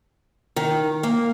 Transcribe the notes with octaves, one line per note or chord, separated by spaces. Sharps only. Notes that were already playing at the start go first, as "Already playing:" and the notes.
D#3
A#3